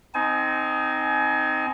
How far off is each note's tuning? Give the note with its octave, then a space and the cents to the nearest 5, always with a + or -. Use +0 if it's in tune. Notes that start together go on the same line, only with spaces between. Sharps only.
C4 -10 D#4 +0 G#5 +30